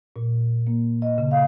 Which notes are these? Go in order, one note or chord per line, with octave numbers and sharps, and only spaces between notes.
A#2
A#3
D#5
C#3
F5